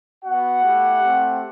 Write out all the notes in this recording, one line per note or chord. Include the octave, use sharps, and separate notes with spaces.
B3 F#4 F#5
A3 E4 G4
A3 C4 G4